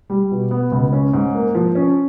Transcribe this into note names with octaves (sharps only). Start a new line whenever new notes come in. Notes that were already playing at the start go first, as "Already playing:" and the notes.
G3
B2
B3
C#2
C#4
G#2
A#3
F3
C#4